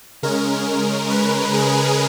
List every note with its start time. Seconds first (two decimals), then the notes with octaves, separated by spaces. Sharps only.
0.23 C#3 G#3 C#4 A#4
1.10 B4
1.54 G#4